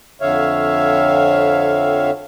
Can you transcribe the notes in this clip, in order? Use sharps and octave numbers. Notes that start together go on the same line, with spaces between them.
F2 D3 C#5 E5 F5